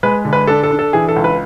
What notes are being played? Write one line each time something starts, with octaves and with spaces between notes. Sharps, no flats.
G#3 B4
D3
B4
D4 A4
A4
D4
A4
E3 G#4
A4
C#2
B4